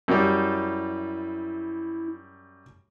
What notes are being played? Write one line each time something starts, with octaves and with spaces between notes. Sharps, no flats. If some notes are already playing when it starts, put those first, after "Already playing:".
F#2 G3 E4